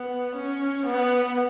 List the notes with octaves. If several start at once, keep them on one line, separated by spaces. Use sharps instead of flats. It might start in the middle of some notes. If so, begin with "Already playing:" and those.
Already playing: B3
C#4
B3